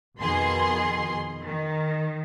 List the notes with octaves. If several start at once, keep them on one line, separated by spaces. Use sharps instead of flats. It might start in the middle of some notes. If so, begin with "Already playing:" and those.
F2 B2 D#3 G#4 C6
D#3